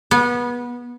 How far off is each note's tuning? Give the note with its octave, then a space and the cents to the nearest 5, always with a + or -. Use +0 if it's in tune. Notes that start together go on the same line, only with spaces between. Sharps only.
B3 -25